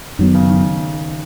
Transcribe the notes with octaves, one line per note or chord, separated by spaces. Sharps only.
F#2 D#3 F#3 B3
C#3
D#3